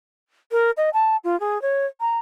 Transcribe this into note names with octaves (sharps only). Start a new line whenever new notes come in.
A#4
D#5
A5
F4
G#4
C#5
A#5